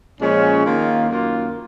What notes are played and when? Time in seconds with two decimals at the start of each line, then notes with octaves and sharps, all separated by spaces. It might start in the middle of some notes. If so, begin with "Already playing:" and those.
0.21 A#2 F3 G#3 C#4
0.64 D#3 A#3 F4
1.07 F#2 D#3 A#3 F4